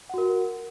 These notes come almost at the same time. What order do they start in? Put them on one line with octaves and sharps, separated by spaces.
F#5 F#4 A#4